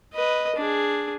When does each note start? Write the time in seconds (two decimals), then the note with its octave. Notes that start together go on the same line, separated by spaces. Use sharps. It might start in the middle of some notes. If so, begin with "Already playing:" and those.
0.14 B4 D#5
0.56 D4 G#4